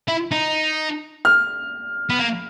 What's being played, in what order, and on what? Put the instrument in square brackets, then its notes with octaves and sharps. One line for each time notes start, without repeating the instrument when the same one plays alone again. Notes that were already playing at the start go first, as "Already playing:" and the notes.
[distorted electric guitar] E4
D#4
[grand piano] F6
[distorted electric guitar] B3
A#3